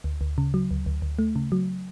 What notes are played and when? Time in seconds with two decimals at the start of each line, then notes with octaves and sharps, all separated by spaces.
0.04 D2
0.21 D2
0.38 C#3
0.54 F#3
0.71 D2
0.86 D2
1.02 D2
1.19 A3
1.36 C#3
1.52 F#3